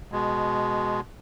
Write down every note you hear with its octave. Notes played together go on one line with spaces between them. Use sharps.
B2 G#3